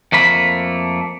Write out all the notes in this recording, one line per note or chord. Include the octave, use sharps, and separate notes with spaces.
F2 A3 A#3 B5